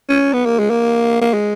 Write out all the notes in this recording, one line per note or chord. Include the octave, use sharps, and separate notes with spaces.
C#4
B3
A#3
G#3
A#3
A#3
G#3